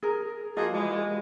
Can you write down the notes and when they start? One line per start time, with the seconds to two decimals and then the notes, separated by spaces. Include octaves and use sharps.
0.03 G#4 A#4
0.57 F3 A#3 F4 F#4 G#4 D#5
0.73 E3 G3 G#3